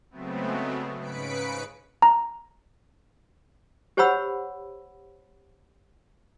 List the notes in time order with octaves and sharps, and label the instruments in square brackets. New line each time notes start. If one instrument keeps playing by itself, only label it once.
[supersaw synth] C#3 F#3 G#3 A3 B3 C4
G#2 C#3 B4 B6 C#7 D7
[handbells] A#5
[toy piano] G4 C5 C#5 F#5 B5 E6